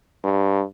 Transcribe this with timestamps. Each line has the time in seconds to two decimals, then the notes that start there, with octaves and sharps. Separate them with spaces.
0.24 G2